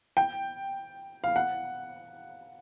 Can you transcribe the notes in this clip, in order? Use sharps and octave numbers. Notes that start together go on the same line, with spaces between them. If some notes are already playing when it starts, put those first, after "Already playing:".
G5
F5
F#5